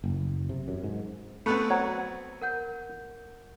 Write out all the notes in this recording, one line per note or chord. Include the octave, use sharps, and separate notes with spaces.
F#1
C3
F#2
G#2
A3 B3 C4 B5 C#6 F#6
F#3 C5 G#6
A#4 F#5 G6